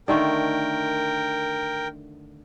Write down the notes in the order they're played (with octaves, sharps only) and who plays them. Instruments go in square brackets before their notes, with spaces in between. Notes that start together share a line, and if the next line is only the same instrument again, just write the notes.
[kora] D3 D#3 A3 [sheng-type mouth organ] A#4 G5